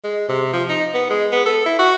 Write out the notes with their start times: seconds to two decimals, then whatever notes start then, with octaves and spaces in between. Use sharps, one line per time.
0.04 G#3
0.29 C3
0.53 F3
0.69 D#4
0.94 B3
1.10 G#3
1.32 B3
1.45 A4
1.66 E4
1.79 F#4